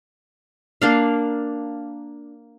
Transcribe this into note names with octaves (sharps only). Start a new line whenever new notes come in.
A#3 D4 F5